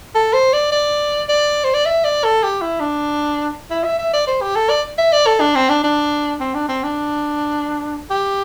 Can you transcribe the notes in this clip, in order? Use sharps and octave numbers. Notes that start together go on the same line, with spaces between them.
A4
C5
D5
D5
D5
C5
D5
E5
D5
A4
G4
E4
D4
E4
E5
E5
D5
C5
G4
A4
D5
E5
D5
A4
D4
C4
D4
D4
C4
D4
C4
D4
G4